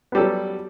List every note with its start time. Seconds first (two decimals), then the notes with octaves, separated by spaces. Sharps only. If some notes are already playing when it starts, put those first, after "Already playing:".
0.12 B3
0.15 G3
0.17 A4
0.20 F#3